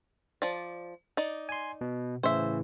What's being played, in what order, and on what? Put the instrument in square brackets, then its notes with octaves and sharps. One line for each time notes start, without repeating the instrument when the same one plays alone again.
[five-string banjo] F3 D5
D#4 D5
[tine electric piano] G#5 C6
B2
[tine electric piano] A2 C#3 E3 [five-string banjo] C5 E5